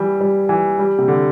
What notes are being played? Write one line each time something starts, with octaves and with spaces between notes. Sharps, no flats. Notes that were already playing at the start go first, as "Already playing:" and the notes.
Already playing: E3 G3
G3
E3
G3
C3
D3